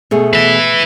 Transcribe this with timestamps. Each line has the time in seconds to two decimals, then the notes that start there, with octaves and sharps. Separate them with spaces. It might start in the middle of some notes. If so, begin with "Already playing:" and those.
0.11 B2 A3 G#4
0.33 B4 E5